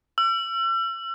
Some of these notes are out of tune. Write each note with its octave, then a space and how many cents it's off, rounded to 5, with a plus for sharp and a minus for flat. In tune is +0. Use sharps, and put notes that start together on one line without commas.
E6 +40